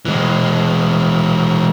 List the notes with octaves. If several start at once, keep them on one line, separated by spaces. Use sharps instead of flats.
E3 G#3